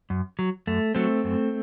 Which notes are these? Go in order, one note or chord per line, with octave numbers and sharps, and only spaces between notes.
F#2
F#3
F#2 A3
F#3 A3 C4
F#2